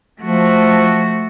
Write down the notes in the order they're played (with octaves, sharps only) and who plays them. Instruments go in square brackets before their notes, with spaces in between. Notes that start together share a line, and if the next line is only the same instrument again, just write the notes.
[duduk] F3 [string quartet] A3 F#4